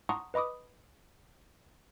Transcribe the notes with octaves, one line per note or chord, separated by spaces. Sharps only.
F#5 A5 A#5 C6 C#6 D#6
B4 D#5 B5 D6 D#6